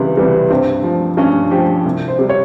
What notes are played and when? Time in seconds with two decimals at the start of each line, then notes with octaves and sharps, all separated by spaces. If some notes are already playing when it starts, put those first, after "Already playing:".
Already playing: C#2 C3 E3 G3
0.17 C3 E3 G3
0.50 G2 C4
0.84 F3
1.17 G2 C#4
1.51 F3 G4
1.86 C2
2.08 C5
2.19 C3 G3
2.29 C#5